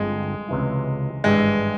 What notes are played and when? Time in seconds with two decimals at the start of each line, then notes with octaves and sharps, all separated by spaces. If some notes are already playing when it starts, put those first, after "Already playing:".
Already playing: G1 G2 F3 G#3 C4
0.49 C#2 C3 E3 G#3 E4
1.24 G#1 G2 E3 G3 G#3